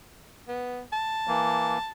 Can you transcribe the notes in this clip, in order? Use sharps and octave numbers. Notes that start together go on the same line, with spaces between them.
B3
A5
E3 A#3